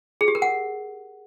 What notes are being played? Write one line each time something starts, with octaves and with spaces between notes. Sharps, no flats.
G#4
G4
A#4
F#5